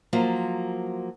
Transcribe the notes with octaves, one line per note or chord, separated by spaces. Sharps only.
F3 F#3 A#3 F4